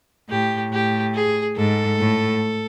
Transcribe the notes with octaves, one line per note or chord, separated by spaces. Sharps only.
A2 G4
A2 G4
G#4
G#2 A4
A2